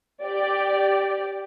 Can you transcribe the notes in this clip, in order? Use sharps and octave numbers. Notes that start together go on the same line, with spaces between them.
G4 D5